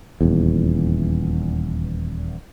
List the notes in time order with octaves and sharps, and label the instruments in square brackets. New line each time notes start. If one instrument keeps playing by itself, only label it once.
[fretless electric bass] D#1 E2